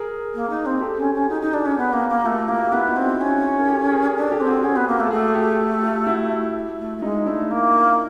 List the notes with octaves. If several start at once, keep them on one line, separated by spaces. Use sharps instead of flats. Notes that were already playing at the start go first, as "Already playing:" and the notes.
Already playing: G#4 A#4
A#3
D#4
C4
G4 A4
C#4
C#4
D#4 F#4 G#4
D#4
D4
C#4
B3
A#3
A#3
A3 F4 G4
A#3 E4 F#4
G4
B3 E4 F#4
D#4 F4
C4
F#4 G#4
C#4
A#4
G4 A4
G#4 A#4
D4
G4 A4
C4
F#4 G#4
C#4 F#4 G#4
B3
A#3
A3
A4
A3 F#4 G#4
G4 A4
F4 G4
E4 F#4
A3
A3
G#3 D#4 F4
A3 D4 E4
A#3